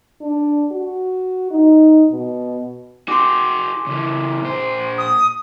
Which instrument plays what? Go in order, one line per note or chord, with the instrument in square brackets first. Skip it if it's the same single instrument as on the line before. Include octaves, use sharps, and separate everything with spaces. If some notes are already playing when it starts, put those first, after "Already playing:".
[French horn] D4
F#4
D#4
B2
[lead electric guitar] F#4 G#4 [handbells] C6 D6
[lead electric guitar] C#3 E3
A#2 C5
[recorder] D#6